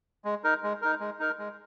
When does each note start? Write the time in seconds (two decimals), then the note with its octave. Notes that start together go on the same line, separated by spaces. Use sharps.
0.25 G#3
0.44 D#4 A#4
0.63 G#3
0.82 D#4 A#4
1.00 G#3
1.20 D#4 A#4
1.38 G#3